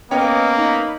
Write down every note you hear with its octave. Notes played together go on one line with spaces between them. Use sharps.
A#3 B3 C#4 B4 C#5 D#5 G5 D6
D#4 B5